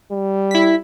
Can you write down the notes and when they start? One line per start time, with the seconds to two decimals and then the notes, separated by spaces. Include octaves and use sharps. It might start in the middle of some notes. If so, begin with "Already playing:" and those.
0.11 G3
0.51 E4 B6